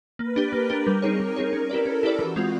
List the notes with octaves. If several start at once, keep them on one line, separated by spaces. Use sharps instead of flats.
A#3 B4
D4 G4
A#3 A#4
D4 G4
G3
C4 D#4 G#4 C#5
G3
C4 D#4 G#4 C#5
C#4 A#4
E4 G4 B4 D5
C#4 A4
E4 G4 B4 D5
E3 F#4
G#3 C4 F4